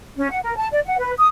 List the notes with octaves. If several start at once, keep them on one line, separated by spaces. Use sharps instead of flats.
C#4
F#5
A#4
A5
D5
F#5
B4
D#6